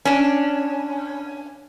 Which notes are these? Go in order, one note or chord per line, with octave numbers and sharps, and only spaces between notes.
C#4 D4